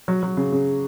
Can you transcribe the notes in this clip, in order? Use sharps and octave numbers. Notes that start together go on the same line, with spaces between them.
F#3
F#3
C#3
C#3